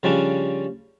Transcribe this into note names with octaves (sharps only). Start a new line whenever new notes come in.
C#3 F3 G3 C#4 D4